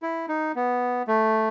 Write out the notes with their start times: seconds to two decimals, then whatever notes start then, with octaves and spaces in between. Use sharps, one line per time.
0.02 E4
0.29 D#4
0.56 B3
1.07 A3